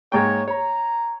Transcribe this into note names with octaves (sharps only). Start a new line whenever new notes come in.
G#2 A#3 C#5 G5
C#5 A#5